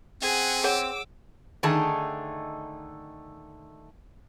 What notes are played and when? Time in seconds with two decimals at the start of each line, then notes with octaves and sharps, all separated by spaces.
0.22 C4 C#4 G#4 F#5
0.64 G#4 C#5 F#5 D6 E6
1.63 D3 D#3 A3 D#4 G#4 A5